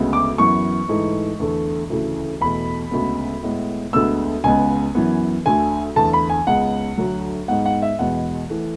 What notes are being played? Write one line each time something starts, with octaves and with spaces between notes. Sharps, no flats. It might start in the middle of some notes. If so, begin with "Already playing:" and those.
Already playing: D2 C#3 G#3 B3
D6
F#2 E3 B3 C#6
G#2 E3 A3
E2 D3 A3
D2 C#3 E3 A3
E2 B2 A3 B5
D2 C#3 G#3 B3
A2 G#3 B3
D2 D3 G#3 B3 E6
C#2 C#3 G#3 B3 G#5
F#2 E3 B3
D2 D3 A3 G#5
E2 D3 A3 A5
B5
G#5
C#2 C#3 G#3 B3 F#5
D2 D3 F#3
G#2 G#3 B3 F#5
F#5
E5
E2 B2 G#3 B3 F#5
E3 A3